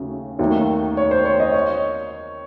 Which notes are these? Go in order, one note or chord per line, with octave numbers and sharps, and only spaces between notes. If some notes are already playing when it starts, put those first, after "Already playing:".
Already playing: D#2 C#3 F#3 A3
D#2 D#3 F#3 A3
C#5
C5
C#5
D#5
C#5